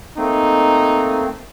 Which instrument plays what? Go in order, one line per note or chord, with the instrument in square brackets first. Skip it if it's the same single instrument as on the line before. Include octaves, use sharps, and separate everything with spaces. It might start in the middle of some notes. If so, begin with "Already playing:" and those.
[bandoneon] A3 A#3 C4 [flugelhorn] D#4